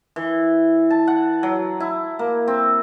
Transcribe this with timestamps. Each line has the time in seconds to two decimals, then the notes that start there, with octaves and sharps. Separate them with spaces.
0.16 E3
0.90 A5
1.07 F#5
1.43 F#3
1.80 E4
2.19 A#3
2.48 C4